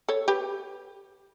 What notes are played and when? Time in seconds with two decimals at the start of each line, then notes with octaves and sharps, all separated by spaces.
0.09 A4 C#5
0.28 G4 B4